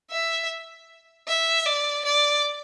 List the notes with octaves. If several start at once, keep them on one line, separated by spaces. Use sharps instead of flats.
E5
E5
D5
D5